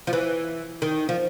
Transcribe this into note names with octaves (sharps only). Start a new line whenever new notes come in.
F3
E3
D#3
F3